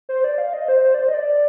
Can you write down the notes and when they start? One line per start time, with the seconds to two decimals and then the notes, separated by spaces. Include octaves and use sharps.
0.09 C5
0.24 D5
0.38 F5
0.53 D#5
0.68 C5
0.84 C5
0.94 D5
0.99 C5
1.09 D#5
1.14 D5